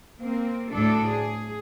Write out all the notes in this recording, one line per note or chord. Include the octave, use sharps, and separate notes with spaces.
A#3 C4
D2 A2 D4 A4 D5
G#4